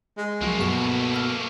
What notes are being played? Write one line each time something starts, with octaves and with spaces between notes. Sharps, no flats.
G#3
C#2 F3 F#3 A3 A#3
G2 B2 C#6 E7
E6 F6